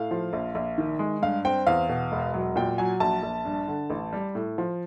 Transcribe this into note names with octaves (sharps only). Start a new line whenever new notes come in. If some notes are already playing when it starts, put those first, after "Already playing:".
Already playing: A2 F5
F3
A#1
A#1
D#3
G#3
G2 F5
C4 G5
E2 F5
B2
E1
F#3
A#2 G5
F#3 G#5
A#1 A5
A#1
G2
D3
A1
G3
A2
F3